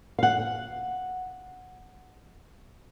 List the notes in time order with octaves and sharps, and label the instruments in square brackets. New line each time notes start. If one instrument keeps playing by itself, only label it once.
[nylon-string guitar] F5 F#5